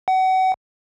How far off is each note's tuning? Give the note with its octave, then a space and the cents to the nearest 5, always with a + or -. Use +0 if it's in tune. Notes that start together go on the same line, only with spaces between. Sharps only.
F#5 +30